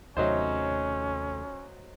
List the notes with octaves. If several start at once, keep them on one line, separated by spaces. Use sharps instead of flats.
D#2 C3 F#3 A3 C#4 D#4 C5